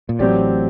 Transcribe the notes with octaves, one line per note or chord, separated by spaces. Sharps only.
A#2
A1 A2 F#3 C4 G4 D5